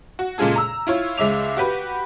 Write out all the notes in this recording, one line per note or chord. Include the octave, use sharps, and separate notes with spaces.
F#4
A#2 C#3 G#3 F4 G#4 A4
A#5 E6
E4 F4 C#5
C#2 G#3 E5 D6 F7
F#4 G4 B4